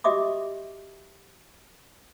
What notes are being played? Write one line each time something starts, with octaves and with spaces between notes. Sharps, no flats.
F#4 G4 D#5 E5 D6 D#6